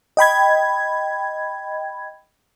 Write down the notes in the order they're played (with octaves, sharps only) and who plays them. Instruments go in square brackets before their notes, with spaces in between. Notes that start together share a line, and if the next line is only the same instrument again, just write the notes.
[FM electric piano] D#5 G5 B5 G#6